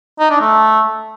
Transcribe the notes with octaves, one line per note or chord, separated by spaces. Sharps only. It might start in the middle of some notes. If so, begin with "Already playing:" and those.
D#4
D4
A3